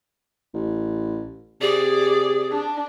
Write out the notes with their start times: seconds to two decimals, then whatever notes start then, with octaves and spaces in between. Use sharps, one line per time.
0.54 A1
1.61 C3 G#4 D5
2.51 D4